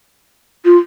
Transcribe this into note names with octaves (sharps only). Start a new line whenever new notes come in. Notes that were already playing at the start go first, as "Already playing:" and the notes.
F4